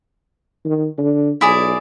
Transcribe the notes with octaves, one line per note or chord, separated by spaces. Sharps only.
D#3
D3
B1 E4 G#4 D5